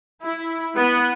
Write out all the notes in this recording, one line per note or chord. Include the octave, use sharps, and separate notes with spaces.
E4
B3